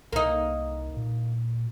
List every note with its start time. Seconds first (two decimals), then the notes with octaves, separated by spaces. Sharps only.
0.13 C2 A#3 D#4
0.97 A#2